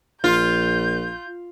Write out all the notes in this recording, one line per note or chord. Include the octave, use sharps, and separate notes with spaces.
A#1 F4 G6